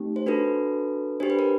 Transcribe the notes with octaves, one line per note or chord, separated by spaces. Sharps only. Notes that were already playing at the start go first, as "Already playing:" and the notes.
Already playing: A3 C4 D#4 G4
C5
D4 F#4 A4 B4
D4 G4 C5
B4
A#4